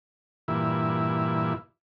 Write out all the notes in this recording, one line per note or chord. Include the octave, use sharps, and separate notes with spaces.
G2 A#2 E3 E4